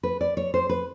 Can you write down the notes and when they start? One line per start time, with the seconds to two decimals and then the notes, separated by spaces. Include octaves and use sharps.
0.03 B4
0.21 D5
0.37 C#5
0.54 C5
0.69 B4